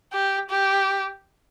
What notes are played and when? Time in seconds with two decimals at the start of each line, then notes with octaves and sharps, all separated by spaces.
0.13 G4
0.50 G4